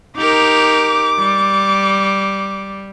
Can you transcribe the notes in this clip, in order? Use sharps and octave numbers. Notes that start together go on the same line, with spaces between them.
D#4 G4 A#4 D6
G3